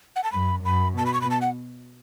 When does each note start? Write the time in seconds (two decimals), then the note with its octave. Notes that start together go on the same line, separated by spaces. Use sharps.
0.16 F#5
0.24 A5
0.32 F#2 B5
0.64 F#2 B5
0.97 B2 A5
1.06 B5
1.14 C#6
1.21 B5
1.31 A5
1.42 F#5